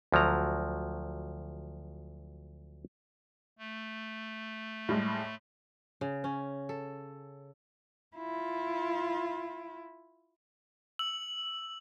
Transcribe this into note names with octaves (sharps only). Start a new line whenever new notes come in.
D2 F3 F#3 A#5
A3
A2 G3 G#3
C#3
C#4
A4
E4 F4
E6 F#7